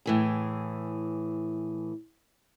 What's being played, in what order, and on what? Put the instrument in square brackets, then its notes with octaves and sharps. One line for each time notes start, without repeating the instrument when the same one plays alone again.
[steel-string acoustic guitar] A2 E3 G#4